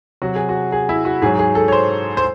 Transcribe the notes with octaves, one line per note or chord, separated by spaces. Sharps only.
C3 F#3 F#4
G#4
F#4
G#4
E4
F#4
G#2 F#3 G#4
G#4
A4
C#5
C5
C5